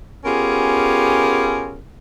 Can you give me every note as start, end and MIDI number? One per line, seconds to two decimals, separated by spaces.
0.25 1.79 59
0.25 1.79 61
0.25 1.79 65
0.25 1.79 67
0.25 1.79 68
0.25 1.79 70